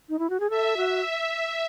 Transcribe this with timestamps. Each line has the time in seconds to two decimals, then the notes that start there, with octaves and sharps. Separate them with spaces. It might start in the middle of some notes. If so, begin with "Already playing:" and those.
0.09 D#4
0.19 E4
0.30 F#4
0.40 G#4
0.50 A4 E5
0.77 F#4